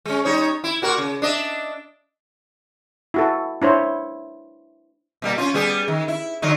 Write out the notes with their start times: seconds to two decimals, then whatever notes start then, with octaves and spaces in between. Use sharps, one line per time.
0.05 G#3 C#4
0.25 G3 D#4 C#5
0.64 E4
0.82 A#2 F#4 A#4
0.98 C#3
1.22 D4 D#5 E5
3.14 E4 F#4 A4
3.62 D4 E4 C5 C#5
5.22 B2 G3 A#3
5.38 C#4 F4
5.54 G3 B3 G#4
5.88 D#3
6.08 E4
6.42 D3 F#3 D#4